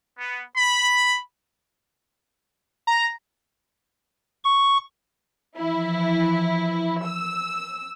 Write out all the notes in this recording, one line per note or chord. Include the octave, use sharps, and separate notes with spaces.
B3
B5
A#5
C#6
E3 F3 E4
E6